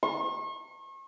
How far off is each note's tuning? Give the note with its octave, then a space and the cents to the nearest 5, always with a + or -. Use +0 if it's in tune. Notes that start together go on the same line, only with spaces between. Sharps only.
C#6 -40